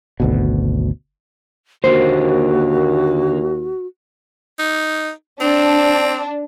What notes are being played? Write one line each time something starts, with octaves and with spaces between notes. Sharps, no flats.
G#1 D2 B2
D#2 D3 A#3 F#4 C5
D#4
C4 D4